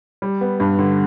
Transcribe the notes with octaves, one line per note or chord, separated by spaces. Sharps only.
G3
B3
G2
D3